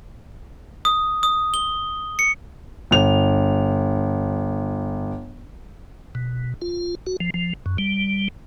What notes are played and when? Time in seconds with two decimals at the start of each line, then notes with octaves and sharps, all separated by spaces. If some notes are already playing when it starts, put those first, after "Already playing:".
0.85 D#6
1.23 D#6
1.54 G7
2.19 C#7
2.91 G1 F7
6.15 B2
6.62 F4
7.07 F#4
7.20 F3
7.34 F3
7.66 F#2
7.78 G3